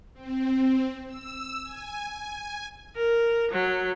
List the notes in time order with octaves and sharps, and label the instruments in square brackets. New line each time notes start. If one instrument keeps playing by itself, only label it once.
[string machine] C4
E6
G#5
G#5
[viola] A#4
F#3